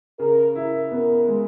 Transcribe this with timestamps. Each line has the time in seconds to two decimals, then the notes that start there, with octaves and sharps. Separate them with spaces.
0.19 C#3 A#4
0.55 E4 A#4
0.91 B3 A#4
1.28 G#3